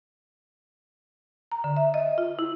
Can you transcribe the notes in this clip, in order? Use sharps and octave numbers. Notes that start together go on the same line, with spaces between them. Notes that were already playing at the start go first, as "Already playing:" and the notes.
A#5
D3
E5
D#5
F4
E4